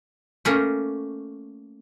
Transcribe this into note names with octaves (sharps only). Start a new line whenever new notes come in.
A3 A#3 C#4